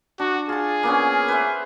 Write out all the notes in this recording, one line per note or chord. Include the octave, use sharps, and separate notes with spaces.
D4 F#4
F4 G#4 A5
A#3 B3 C#4
B4 C5 E5